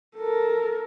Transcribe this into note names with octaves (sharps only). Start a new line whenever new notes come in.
A4 A#4